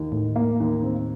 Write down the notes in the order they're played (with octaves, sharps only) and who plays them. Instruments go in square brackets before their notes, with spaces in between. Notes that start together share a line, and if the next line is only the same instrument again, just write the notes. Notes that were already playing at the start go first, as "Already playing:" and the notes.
Already playing: [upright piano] D#2
[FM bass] A2 [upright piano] D#3
[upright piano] A#3
D#2
C4